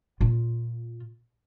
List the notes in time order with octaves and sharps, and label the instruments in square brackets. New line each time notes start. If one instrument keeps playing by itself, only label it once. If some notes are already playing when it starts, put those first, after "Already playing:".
[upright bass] A#2 F4